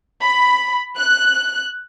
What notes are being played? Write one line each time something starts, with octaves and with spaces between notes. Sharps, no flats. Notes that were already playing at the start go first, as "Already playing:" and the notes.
B5
F#6